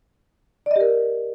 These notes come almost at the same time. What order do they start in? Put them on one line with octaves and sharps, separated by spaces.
D5 D#5 G4 A#4